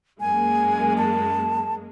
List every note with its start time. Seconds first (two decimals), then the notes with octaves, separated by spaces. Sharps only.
0.20 F#2 G#3 A#3 G#5
0.98 A5